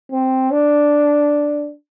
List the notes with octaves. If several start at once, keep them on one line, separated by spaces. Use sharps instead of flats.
C4
D4